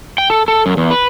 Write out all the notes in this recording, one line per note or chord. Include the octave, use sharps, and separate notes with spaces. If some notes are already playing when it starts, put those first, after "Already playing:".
G5
A4
A4
F#2
E2
B4